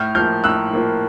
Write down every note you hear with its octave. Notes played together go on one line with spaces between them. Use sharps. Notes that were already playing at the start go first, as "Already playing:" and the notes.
Already playing: A2 F6 G6
F3 A#3 F6 G6
A2 E6 F#6
F3 A#3